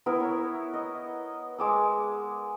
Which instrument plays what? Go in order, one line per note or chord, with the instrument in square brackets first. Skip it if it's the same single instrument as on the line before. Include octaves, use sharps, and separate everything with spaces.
[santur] B3 E4 A#4
C#5
D#5
G#3 D6 E6